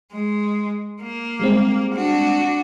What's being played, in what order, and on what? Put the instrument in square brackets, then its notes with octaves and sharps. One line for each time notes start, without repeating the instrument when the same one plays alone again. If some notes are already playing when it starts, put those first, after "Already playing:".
[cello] G#3
A#3
[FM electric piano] G3 G#3 C4
[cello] D4 F#4